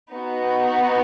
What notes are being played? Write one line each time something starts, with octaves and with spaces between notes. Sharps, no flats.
B3 D#4 F#4